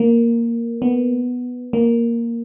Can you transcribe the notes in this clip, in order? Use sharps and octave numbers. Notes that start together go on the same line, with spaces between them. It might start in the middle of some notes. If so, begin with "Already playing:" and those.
Already playing: A#3
B3
A#3